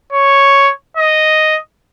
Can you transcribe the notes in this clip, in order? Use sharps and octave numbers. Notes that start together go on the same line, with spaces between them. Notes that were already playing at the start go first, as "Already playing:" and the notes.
C#5
D#5